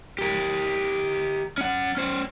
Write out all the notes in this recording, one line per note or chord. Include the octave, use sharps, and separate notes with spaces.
G4 A#4
C#4 F#5
C#4 C5